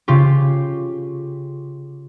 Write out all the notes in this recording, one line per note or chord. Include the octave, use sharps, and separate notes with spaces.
C#3 F4 G4